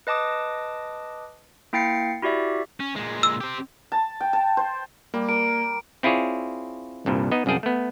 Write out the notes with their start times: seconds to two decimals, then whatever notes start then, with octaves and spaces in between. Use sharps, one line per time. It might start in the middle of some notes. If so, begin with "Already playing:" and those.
0.07 B4 D#5 A5 D6 D#6
1.73 A#3 E4 G5 A6 C7 C#7
2.22 E4 F#4 G4 D5 E5
2.80 C#4
2.96 A#2 G#3
3.23 E6
3.41 C4 G4
3.92 A5
4.21 G5
4.33 A5
4.57 C5
5.14 G3 A#3
5.29 A#4 D7
6.03 C4 E4 F4 G#4 C#5 D5
7.06 C2 G2 A#2
7.32 B3 D#4 D#5
7.46 C2 F#2 A#3 G#4 G5 A5
7.63 A3 B3